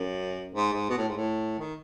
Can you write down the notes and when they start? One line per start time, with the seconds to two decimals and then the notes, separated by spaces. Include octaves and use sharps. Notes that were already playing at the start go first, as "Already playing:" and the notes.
Already playing: F#2
0.55 G#2
0.73 G#2
0.89 B2
0.98 A2
1.08 G#2
1.16 A2
1.59 D#3